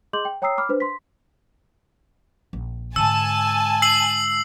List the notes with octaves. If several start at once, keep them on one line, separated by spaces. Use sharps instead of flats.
G#4 D#5 C6 D6 G6 F#7
G5
C#5 G5 A#5 D#6 E6 C7
B5 D6 F6
D4 B4 C5
C6 B6
A#1
G#2 D3 G#5 A5 E6
E6 C7 F#7